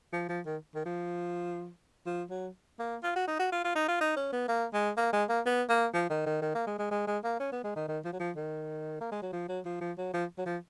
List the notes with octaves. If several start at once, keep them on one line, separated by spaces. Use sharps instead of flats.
F3
F3
D#3
D#3
F3
F3
F#3
A#3
F4
F#4
D#4
F#4
F4
F4
D#4
F4
D#4
C#4
B3
A#3
G#3
A#3
G#3
A#3
B3
A#3
F3
D#3
D#3
D#3
A#3
G#3
G#3
G#3
G#3
A#3
C#4
B3
G#3
D#3
D#3
F3
F#3
F3
D#3
A#3
G#3
F#3
F3
F#3
F3
F3
F#3
F3
F#3
F3